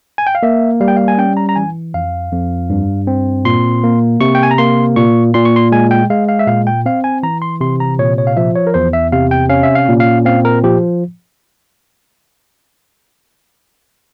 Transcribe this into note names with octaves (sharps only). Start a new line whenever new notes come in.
G#5
G5
F5
A#3 E5
G3 F5
G5
F5
G#5
C#4 G5
A#5
A#5
E3 G#5
F2 F5
F2
G2
C4
A#2 C6
A#3
C3 C#6
G5
G#5
A#5
A#3 C6
A#2 C#6
A#2 C6
C#6
C6
G#3 G#5
G5
G#3 F5
F5
E5
A#2 F5
G5
C4 F5
G#5
E3 A#5
C6
C3 C6
A#5
A#2 C#5
C#5
F5
F3 E5
C#5
A#4
E2 C5
E5
C3 F5
G5
C#4 F5
E5
F5
A#2
F5
C4 F5
A#4
F3 G4